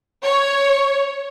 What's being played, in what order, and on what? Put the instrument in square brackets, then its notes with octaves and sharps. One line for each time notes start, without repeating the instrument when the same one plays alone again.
[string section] C#5